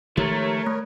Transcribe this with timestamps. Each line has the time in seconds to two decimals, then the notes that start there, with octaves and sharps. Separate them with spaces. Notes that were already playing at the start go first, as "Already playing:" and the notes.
0.17 D#3 F3 G#3 A3 G4 A#4 C#5
0.67 A3